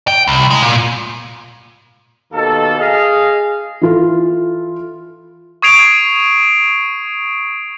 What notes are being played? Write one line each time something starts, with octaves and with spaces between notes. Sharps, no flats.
G5
C2
G#3
A#2
D#2 B2 A#3 A4
G#4 D#5 F5
E3 F4 A4
C#6 D#6 G#6 C7 D7 F7